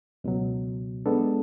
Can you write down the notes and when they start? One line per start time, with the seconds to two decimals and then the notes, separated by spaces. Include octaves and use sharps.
0.24 C#2 B2 F#3
1.06 G#3 B3 D4 A4